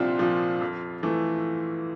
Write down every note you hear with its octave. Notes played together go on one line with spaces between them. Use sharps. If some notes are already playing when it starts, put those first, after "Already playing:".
Already playing: C2 A#2 F3 C4 D4 F4
A#2 F3
F2
E3 A3